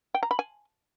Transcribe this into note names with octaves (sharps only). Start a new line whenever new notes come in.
G5
A#5
B5
G#5